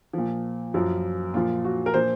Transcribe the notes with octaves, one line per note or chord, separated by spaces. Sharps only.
A#2 F3
F#2 F3
A#2 F3 F4
F#4
A#4
A#2 F3 C5